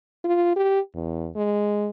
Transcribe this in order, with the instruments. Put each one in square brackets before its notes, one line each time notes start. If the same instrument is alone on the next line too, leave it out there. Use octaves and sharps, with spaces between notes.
[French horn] F4
G4
E2
G#3